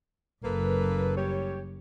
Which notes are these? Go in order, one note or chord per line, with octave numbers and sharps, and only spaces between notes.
F#1 A#3 A4 B4
G3 G4 C#5